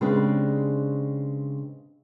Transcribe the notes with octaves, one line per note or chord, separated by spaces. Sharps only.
C#3 G#3 C4 D4 G4 B4